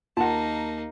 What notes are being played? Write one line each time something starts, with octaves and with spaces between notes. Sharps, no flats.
D#2 A#3 D#4 F4 F#5 A5